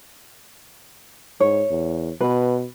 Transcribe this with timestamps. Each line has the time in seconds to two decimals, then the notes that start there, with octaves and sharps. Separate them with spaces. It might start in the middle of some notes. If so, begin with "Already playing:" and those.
1.40 G#2 C#5
1.70 E2
2.21 B2 B4